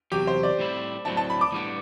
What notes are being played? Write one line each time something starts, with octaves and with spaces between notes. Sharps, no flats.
E2 C3 F#3 G4
C5
D5
A2 G3 C4 E4
A2 F#3 C4 E4 A5
A5
B5
D6
A2 G3 B3 D4